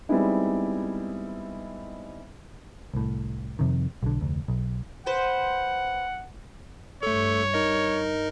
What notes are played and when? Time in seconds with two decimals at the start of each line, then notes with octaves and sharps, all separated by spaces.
0.09 G3 G#3 B3 C4 D#4 E4
2.94 C2 A2
3.59 F2 C3 D#3
4.03 B1 D3
4.21 F1 D2
4.48 B1
5.06 B4 C5 F#5
7.03 G2 A3 A4 C#5
7.54 D#4 A#4 D#5